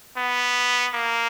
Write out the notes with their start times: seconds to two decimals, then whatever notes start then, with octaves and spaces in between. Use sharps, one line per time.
0.17 B3
0.94 A#3